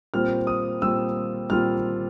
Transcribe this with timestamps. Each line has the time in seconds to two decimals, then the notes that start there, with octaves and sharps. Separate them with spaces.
0.14 A#2 G3 C4 F4 F6
0.47 D#6
0.82 A#2 G3 C4 F4 E6
1.50 A#2 G3 C4 F4 F6